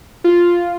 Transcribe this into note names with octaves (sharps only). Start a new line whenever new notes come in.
F4